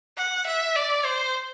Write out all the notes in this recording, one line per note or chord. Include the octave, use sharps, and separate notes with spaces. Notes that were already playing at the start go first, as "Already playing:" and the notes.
F#5
E5
D5
C5